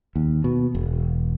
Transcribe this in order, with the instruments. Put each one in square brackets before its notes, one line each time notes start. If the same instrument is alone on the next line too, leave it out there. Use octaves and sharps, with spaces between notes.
[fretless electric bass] D#2
B2
E1